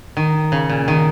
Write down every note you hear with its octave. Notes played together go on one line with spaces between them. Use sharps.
D#3
C#3
A#2
D#3